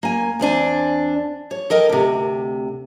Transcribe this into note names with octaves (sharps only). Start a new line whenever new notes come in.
A#3 G#5
E2 C4 D4 G#5
C#5
A4 A#4 D#5 G5
D2 C3